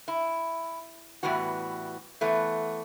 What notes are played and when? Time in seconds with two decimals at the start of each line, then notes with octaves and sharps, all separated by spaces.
0.08 E4
1.23 A2 E3 G3 B3 F#4
2.21 E3 A3 B3